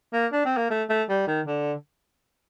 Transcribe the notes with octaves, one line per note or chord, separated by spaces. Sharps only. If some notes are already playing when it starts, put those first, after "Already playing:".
A#3
D4
C4
A#3
A3
A3
G3
D#3
D3